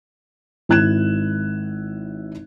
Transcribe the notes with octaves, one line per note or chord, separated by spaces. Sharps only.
G#1 E4 F#6 G#6 E7